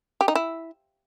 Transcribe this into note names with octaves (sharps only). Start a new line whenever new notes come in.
G4
D#4
E4